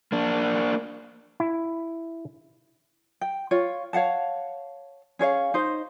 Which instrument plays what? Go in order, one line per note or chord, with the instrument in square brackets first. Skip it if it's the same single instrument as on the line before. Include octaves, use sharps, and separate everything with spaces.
[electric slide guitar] A#3 D4
[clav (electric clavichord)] E4
[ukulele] G5
F4 C#5
C#5 F5 F#5 A5
C#4 G#4 C#5 F5
D#4 C5